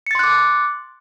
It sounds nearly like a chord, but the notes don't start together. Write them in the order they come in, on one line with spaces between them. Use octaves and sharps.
C#7 A6 C6 F#6 D6